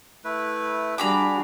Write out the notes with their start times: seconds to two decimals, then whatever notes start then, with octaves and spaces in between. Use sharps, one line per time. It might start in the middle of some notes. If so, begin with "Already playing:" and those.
0.24 A3 E4 B4
0.98 G3 D4 F#4 G#4 A#5 B5 D6